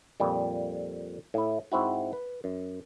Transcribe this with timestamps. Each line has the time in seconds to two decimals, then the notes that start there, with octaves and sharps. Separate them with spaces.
0.20 F2 A#2 G3
1.34 A2 E4
1.72 G#2 C4 E4 F#4
2.13 B4
2.44 F#2